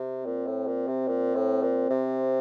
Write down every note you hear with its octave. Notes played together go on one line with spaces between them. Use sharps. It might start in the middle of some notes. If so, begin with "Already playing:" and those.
Already playing: C3
A#2 C4
A2
A#2
C3
A#2
A2
A#2
C3